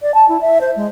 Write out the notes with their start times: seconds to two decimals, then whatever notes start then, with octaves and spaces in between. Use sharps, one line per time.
0.02 D5
0.14 A5
0.28 E4
0.41 E5
0.61 C5
0.76 G#3